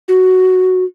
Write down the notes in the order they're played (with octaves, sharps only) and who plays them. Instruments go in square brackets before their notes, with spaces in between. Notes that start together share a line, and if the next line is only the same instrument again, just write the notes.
[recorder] F#4